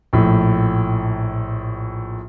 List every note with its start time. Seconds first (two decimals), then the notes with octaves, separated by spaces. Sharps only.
0.13 A#1 A2